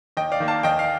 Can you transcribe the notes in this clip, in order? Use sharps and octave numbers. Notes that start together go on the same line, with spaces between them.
D#2 D#5 G5
D5 F5
D#3 A#3
F5 A5
D#2 D#5 G5
F5